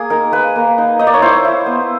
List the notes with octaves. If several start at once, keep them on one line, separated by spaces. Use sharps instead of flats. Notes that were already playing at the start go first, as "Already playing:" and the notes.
Already playing: A#3 G#4
D#4 A#4
A#3 B4
A#3
D#4
D#4 D#5
D5
C#5
E4 C5
E4
B3